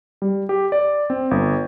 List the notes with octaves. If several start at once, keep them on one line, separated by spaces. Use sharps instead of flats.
G3
G4
D5
C4
G1